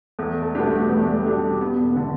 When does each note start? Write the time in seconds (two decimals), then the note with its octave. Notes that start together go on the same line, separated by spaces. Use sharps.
0.19 E2 A3
0.42 A3
0.55 B2 G3 B3 D4 G4
0.67 A3
0.89 E2 B3
0.98 A3
1.08 G3
1.16 A3
1.25 B2 G3 D4 G4
1.61 E1 B3
1.92 B3
1.96 D3 A3